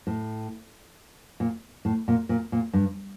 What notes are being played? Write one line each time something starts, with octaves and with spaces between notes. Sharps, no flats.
A2
A#2
A2
A#2
A#2
A#2
G2